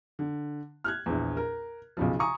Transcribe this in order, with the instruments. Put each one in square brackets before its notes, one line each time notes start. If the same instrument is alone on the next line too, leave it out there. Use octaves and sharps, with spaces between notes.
[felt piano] D3
F6 F#6 G#6
A#1 E2
A#4
B1 C#3 F3
G#5 A#5 C#6 D#6